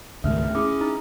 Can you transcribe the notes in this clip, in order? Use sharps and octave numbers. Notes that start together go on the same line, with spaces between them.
C#2 G#2 D#3 A3 F6
C#4 E4 G#4 D6
D#4